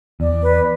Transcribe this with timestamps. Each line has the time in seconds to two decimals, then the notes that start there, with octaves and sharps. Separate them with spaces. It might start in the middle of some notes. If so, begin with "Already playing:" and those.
0.20 E2 D5
0.42 B4